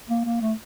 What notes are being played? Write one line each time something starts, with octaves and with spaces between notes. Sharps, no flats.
A#3
A#3
A3